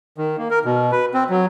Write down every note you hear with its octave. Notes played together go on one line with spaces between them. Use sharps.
D#3
A#3
A#4
B2
B4
C4
F#3